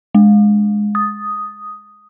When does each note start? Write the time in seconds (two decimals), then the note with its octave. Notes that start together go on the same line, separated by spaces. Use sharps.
0.15 G#3
0.95 D#6